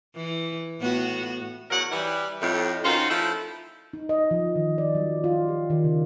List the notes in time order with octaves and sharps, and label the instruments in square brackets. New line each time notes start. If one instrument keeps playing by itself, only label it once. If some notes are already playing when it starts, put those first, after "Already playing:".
[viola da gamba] E3
A2 B3 F#4
[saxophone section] E2 F#3 F#4 A#4 F#5
E3 G3
F2 A2
D#3 C#4 F4 F#4 C5
F3 A3 E4
[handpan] D#4
D#5
F3
D#3
D5
F#3
F4
G4
D#3
C#3